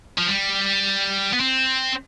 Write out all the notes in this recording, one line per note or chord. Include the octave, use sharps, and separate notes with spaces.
F3
G3
B3
C4